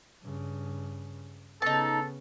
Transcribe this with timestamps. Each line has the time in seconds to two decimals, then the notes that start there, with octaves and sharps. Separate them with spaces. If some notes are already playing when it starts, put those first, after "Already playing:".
0.22 G2 C#3
1.62 C#3 B3 D#4 A4 A5